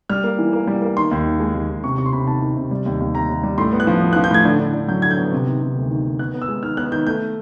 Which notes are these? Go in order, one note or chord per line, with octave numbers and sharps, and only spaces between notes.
G3 F6
A#3
E3
A#3
G3
A#3
D#3 C6
D#2
D#3
G#3
D#2
D#2
C3 C#6
C3 C#6
C6
C3 B5
D#3 A5
D#3
C3
G3
D#2
D#2
D#2 A#5
D#2
G3
A2 C6
B3
F#6
F3
B3
F#6
F3
G6
A2 G#6
D3
D3
D3
F#3 G6
D3 G#6
G6
B3
C3
D#3
C3
D2
D#3
D#3
B3 F#6
B3
E6
G#3
D#3 F6
B3 F#6
D#3 G6
A3 G6